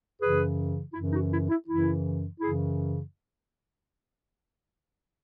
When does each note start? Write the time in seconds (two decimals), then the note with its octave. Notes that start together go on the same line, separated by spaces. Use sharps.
0.21 F#2 C#3 E3 G#4 B4
0.94 F#2 C#3 E3 E4
1.13 D#4 F#4
1.31 E4
1.49 E4
1.67 F#2 C#3 E3 E4
2.41 F#2 C#3 E3 E4 G#4